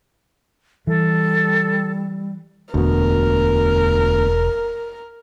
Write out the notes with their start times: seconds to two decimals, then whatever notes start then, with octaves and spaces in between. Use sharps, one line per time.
0.87 E3 G3 A4
2.74 E1 D2 B2 A#4